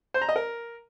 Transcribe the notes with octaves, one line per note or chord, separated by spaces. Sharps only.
C5
A#5
D#5
A#4